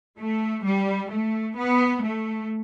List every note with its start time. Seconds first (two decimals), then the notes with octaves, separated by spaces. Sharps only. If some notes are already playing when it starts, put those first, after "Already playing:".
0.18 A3
0.64 G3
1.10 A3
1.57 B3
2.03 A3